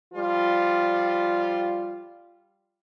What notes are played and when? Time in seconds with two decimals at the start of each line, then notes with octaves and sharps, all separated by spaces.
0.13 F3 G3 F4